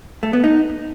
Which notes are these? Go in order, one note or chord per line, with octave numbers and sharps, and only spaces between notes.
A3
B3
D#4